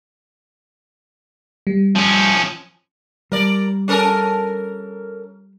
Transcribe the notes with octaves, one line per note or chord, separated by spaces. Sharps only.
G3
F3 C#4
G3 A#4 D5
C#4 A4 A#4